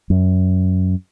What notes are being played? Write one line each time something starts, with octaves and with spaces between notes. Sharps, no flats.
F#2